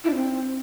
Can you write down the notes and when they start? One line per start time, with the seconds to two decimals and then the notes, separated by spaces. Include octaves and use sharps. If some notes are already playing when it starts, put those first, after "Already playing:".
0.04 E4
0.10 D4
0.15 C4